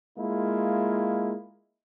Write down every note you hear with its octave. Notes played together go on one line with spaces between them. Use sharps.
G#3 A#3 E4 F4